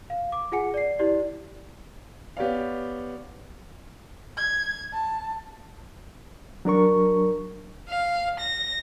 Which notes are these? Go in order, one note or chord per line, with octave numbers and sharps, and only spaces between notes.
F5
D6
F4 G#4 F#5 G#5 C#7
D5 C7
E4 G4 D5
B3 G4 C#5 D5 F5
G#6
A5
F#3 D4 A#4 C#6
F5
A#6